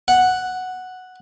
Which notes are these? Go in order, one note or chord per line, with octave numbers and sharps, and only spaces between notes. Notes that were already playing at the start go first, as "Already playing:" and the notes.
F#5